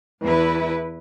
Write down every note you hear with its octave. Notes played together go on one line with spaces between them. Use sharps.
E2 E4 B4